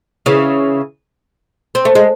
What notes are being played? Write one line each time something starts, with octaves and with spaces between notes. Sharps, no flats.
C#3 E3
C4
A3
G#3